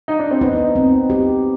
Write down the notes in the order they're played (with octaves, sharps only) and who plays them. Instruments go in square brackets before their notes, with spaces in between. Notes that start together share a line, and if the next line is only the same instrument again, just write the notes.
[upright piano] D#4
D4
C4
[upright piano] B3 [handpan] D#4
[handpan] C4
G4